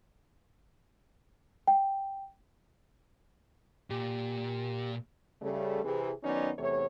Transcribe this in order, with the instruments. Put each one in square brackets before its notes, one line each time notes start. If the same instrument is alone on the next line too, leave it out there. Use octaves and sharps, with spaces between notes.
[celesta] G5
[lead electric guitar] A#2 [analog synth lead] G4
[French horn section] C#3 G3 A3
C3 E3 G#4
D#3 F#3 B3 C#4 D#4 D5
E2 C3 E3 A3 C#5